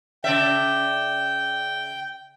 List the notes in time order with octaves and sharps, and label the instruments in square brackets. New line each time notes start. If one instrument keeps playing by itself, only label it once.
[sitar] C#3 D5 E5 [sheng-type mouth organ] G5